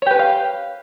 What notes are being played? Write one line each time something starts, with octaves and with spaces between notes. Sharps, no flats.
G4 B4 C#5 F5 G5